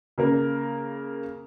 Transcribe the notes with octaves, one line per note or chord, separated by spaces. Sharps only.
C#3 A#3 A#4